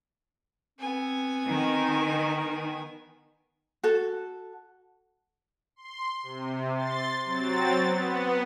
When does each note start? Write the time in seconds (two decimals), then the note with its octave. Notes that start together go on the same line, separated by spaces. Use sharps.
0.79 B3 C4 G#5
1.48 D#3 D#4
3.83 F#4 A4
5.76 C6
6.23 C3
6.75 C6 A6
7.25 F#3 C4 A6
7.85 B3